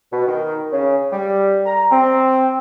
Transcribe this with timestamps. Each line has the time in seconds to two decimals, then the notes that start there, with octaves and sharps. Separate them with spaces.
0.12 B2
0.27 D#3
0.72 C#3
1.12 G3
1.65 A#5
1.91 C4